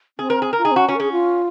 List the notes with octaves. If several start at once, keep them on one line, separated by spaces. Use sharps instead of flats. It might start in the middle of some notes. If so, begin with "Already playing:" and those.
C4 G#4
A#4
G#4
A#4
F4
D#4 G#4
C4
C#4 F#4
C#4 F#4
A#4
C#4 G#4
F4